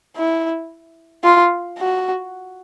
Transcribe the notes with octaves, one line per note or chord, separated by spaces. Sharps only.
E4
F4
F#4